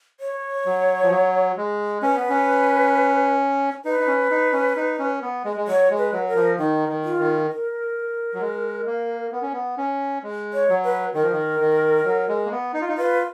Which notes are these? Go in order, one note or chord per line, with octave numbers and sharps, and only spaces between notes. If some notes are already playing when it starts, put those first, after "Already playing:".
C#5
F#3
F3
F#3
G#3
C#4 B4
B3
C#4
D#4 B4
D#4
C#4
D#4
C#4
D#4
C#4
B3
G#3
G#3
F#3 C#5
G#3
B4
F#3
A#4
F3
D#3 D#4
D#3
F4
D#3
A#4
F#3
G#3
A#3
B3
C#4
B3
C#4
G#3
C#5
F#3
B4
D#3 A#4
F3
D#3
D#3
F#3
G#3
A#3
B3
D#4
F4
D#4
F4 B4